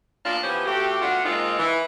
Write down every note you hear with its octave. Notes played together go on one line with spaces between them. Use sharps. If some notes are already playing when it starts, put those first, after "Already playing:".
A#2 A#3 B3 D4 F4
E3 F3 B3 C#4 G4 C5
A3 C4 F#4 G4
A3 B3 D4 F4 F#4 F#5
D#3 G#3 A#3 C4 D#4 F4
E3